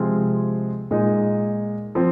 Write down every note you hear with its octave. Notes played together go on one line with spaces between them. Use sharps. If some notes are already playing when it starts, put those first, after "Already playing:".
Already playing: C3 F3 G#3 C4 F4
A#2 G#3 D#4
F3 C4